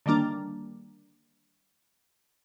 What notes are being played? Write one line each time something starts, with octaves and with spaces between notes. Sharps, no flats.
D3 D#3 G3 A#3 D4